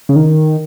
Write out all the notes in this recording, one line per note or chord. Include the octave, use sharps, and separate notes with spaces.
C#3
D#3